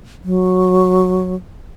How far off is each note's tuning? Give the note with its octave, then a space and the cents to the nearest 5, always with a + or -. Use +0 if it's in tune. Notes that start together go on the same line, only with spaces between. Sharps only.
F#3 -10